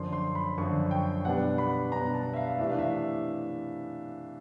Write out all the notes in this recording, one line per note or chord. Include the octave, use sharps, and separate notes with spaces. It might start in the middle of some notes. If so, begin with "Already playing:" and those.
Already playing: F#2 D3 F3 C6
C6
B5
F#2 D3 F3 C#6
G5
B2 G3 B3 D4 F#5
B5
B2 G3 B3 D4 A#5
A5
E5
F5
C3 E3 A3 D4 E5
F5
E5